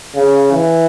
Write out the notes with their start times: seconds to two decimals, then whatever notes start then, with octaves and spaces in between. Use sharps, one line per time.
0.15 C#3
0.52 E3